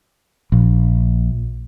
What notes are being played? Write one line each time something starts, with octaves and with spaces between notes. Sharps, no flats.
A#1